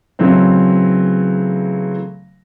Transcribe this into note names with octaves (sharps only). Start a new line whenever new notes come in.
C#3 E3 F#3 A3 C4